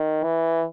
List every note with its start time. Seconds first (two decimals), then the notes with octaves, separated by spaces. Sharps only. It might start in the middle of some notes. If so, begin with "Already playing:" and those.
Already playing: D#3
0.24 E3